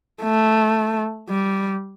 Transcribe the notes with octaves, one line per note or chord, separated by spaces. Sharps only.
A3
G3